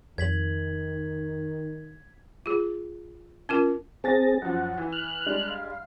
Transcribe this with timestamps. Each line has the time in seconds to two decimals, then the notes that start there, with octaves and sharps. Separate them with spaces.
0.18 F2 D#3 G#6 B6 F#7
2.46 F4 G#4
3.49 C#4 F4 A#4
4.04 C4 G#4 A5 A6 A#6
4.42 F#2 F3 F#5
4.78 E3
4.93 F6 F#6
5.26 G3 G#3 D4
5.50 F5